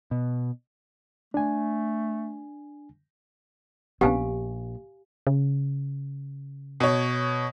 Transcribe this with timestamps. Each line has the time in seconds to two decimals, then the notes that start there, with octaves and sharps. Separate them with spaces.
0.11 B2
1.34 A3 D4 G#5
4.01 A#1 B3 C#4 D4 G4 F5 G#5
5.27 C#3
6.80 B2 C#5